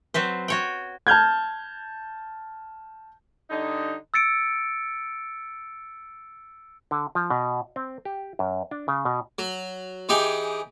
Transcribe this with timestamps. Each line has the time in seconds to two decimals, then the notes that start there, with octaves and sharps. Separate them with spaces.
0.14 F#3 C4 B4 C5
0.48 F#4 C#5 G5
1.07 A5 F6 G6 G#6
3.50 D3 G3 D#4
4.14 E6 A6 C#7 D7
6.91 D3
7.15 F3
7.30 B2
7.76 C4
8.05 G4
8.39 F#2
8.71 D4
8.88 C#3
9.05 B2
9.39 F#3
10.09 E3 D#4 G4 G#4